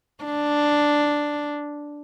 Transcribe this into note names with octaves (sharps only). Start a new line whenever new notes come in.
D4